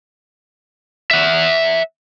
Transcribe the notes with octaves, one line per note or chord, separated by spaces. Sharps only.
E5 F#5